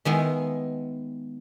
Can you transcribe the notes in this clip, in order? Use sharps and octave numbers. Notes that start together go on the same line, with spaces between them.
D#3 G#3 B3 E4